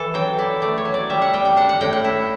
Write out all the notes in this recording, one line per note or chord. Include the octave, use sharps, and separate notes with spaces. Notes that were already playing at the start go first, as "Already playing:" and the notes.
Already playing: E3 A4
F#3 G5
E4 D5
A3 D5
C#5
F#3
D5
G3 E5
F#5
G3 G5
G5
D4 F#5
F#5
A2 G5
F#5
E4